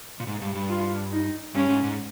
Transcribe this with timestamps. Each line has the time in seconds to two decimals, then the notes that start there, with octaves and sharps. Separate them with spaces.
0.20 A#2
0.27 G#2
0.42 G2
0.55 G2
0.70 F4
1.12 D#4
1.55 G2 C#4
1.70 G#2
1.84 G#2